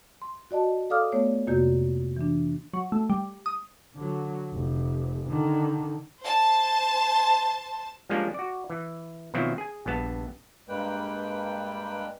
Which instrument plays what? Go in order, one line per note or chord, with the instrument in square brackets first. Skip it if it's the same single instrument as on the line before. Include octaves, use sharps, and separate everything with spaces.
[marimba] C6
F#4 D5 D#5 A5
A4 D5 F5 D6 D#6 F6
A3 B3 C#5 D5
F2 C3 A#3 F#4 D5 G6
E3 D4
[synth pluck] F#3
A3
G3
D#6
[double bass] D3 F#3
F1
D3 D#3
[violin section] C5 A5
[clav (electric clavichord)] F3 G3 G#3 A#3 C#4 D4
F#4 D5
E3
B2 D#3 F3 F#3 C4 E4
G#4 G#5
A#1 G2 B3 A5
[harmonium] G2 G3 G#3 A#3 B4 G5